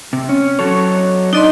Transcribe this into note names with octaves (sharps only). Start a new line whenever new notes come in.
C3
C#4
F#3 A4 C#5
D4 D#4 D5 D#5 C6